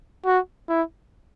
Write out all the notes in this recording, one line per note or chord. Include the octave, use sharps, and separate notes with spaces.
F#4
E4